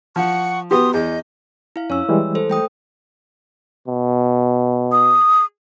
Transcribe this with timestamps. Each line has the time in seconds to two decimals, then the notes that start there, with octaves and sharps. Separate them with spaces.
0.16 F3 F#5 C#6
0.71 B3 F#4 G4 C6 D#6
0.94 E2 D#5 G6
1.76 E4 F5
1.90 F2 C#4 C#5 E6
2.09 E3 G3 G#3
2.35 A4 C5
2.50 A3 G5 D#6
3.88 B2
4.92 D#6